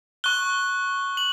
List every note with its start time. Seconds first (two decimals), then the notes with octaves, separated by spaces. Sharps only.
0.24 C#6 F#6 G7
1.17 F#7